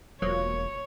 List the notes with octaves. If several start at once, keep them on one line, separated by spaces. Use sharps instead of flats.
E1 F3 F#3 A#3 C#5